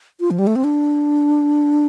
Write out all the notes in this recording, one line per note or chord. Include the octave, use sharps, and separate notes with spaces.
F4
F3
G3
A3
C4
D4